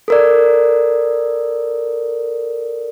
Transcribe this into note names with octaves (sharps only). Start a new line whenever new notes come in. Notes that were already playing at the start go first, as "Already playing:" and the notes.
A4 A#4 D5